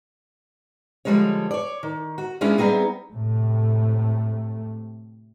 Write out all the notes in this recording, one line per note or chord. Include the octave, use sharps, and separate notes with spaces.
D3 F3 G3 G#3 D#4 C#5
C#5 D5
D#3
F#4
G#3 C#4 D4 E4 F4 G#4
G3 B3 C4 D#4 G#4
A2 C3 A3